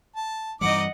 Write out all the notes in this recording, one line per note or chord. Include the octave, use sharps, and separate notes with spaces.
A5
G2 E3 G3 D#4 D#5 F#5 D6